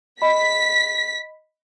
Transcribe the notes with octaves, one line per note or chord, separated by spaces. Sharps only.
D#5 B5 B6